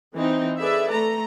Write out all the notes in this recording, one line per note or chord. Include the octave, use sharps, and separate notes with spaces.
E3 C4 D#4
G#4 A4 B4 D5 E5
A3 A#5